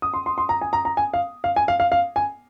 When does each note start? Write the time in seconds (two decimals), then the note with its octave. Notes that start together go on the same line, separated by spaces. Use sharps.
0.02 D#6
0.14 C6
0.26 C6
0.38 C6
0.49 A#5
0.61 G#5
0.73 A#5
0.85 A#5
0.97 G#5
1.14 F5
1.44 F5
1.56 G#5
1.68 F5
1.80 F5
1.92 F5
2.16 G#5